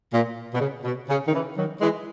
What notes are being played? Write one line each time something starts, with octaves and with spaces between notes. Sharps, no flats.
A#2
B2
C#3
B2
C#3
D#3
C#3 E3
D#3 F#3
E3 G#3